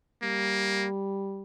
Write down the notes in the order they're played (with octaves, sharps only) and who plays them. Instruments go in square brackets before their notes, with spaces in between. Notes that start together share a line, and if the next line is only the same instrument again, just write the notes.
[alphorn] G3 [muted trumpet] A#3